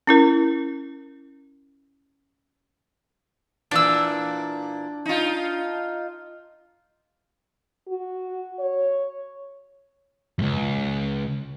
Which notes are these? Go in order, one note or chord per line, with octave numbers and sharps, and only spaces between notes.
C#4 E4 A#4
A#2 E3 D4 E6
D#4 F4
F#4
C#5
C#2 F#2